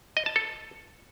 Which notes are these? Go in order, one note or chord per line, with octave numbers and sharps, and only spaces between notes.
D#5
A5
A4